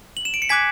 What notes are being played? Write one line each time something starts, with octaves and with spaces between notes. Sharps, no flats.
F#7
E7
D7
C#7
G#5 D6 F#6 G#6 B6